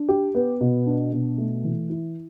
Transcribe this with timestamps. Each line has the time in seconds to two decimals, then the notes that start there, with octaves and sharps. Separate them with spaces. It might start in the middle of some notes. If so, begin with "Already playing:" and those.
Already playing: D4
0.09 G4
0.35 B3
0.61 B2
0.86 D4
1.13 B2
1.38 A3
1.65 E3
1.90 E4